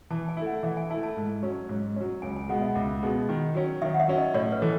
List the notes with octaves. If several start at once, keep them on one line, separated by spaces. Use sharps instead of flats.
E3 A5
G#5
A3 E4
F#5
E3 E5
G#5
A3 E4 A5
A5
G#2
F#3 C#4
G#2
F#3 C#4
C#2 G#5
G#5
B2 G#3 B3 F#5
E5
C#2
B2 G#3 B3
D#3
F#3 C#4
D#3 E5
F#5
E5
F#3 C#4
D#5
A2 C#5
B4
E3 A3